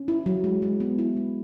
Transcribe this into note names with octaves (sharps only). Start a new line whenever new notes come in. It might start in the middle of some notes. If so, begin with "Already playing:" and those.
Already playing: C#4
E4
F#3
G#3
G#3
B3
E4
G#3